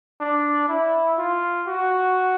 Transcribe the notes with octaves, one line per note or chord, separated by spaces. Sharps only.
D4
E4
F4
F#4